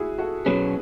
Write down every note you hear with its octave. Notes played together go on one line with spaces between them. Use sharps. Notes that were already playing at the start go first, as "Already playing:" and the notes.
Already playing: E4 F#4 G#4
F#4 A4
B2 F#3 C#4 G#4 B4